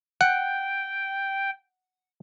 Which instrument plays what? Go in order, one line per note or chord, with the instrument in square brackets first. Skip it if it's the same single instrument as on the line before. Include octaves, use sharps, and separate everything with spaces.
[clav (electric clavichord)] F#5 [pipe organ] G5